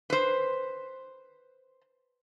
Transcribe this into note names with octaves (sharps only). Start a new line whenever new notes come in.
B4 C5